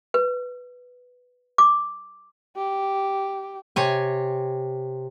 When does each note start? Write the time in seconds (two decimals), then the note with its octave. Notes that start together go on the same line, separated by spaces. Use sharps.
0.14 B4
1.58 D6
2.56 G4
3.76 C3 C#5 G#5